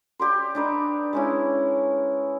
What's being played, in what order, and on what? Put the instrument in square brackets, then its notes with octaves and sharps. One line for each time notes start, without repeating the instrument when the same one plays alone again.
[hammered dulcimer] G4 D5 C6
D4 D#4 B4
G#3 C#4 E4